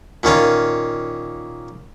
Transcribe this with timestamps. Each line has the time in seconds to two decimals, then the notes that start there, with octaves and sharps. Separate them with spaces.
0.23 A#2 D#3 C#4 F4